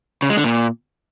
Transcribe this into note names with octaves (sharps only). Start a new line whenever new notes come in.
C#3
G#3
D3
A#2